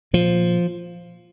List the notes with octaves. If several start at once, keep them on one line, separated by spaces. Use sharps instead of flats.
A#2 F3